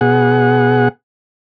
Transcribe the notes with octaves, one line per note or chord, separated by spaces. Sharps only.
B2 G#4 F#5